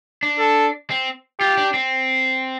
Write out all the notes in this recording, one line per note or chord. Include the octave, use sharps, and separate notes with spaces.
D4
A4
C4
F4 G4
D4
C4